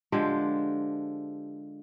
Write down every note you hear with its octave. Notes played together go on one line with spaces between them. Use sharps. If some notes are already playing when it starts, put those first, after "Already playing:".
D3 F3 G#3 G4